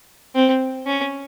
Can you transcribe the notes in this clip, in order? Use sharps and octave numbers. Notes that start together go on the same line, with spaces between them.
C4
C#4